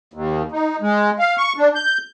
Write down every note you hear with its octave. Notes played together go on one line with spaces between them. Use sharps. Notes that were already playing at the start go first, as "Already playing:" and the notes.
D#2
D#4
G#3
F5
C#6
D4
G6